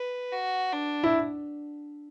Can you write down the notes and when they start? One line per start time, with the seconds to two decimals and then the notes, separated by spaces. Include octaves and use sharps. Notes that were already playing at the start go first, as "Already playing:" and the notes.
Already playing: B4
0.32 F#4
0.73 D4
1.04 E4